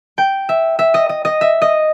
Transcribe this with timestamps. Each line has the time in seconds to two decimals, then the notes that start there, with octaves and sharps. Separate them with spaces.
0.18 G5
0.49 E5
0.79 E5
0.94 D#5
1.09 D#5
1.25 D#5
1.41 E5
1.62 D#5